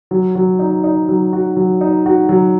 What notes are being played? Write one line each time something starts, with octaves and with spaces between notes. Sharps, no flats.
F#3
F#3
D#4
D#4
F#3
F#4
F#3
D#4
F#4
F#3